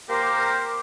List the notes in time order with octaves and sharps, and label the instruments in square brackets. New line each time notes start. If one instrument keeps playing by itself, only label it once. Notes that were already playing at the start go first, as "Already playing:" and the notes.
[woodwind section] A#3 G4 A#4 C5